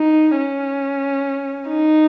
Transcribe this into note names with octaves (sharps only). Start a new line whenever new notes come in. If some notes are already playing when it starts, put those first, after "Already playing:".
Already playing: D#4
C#4
D#4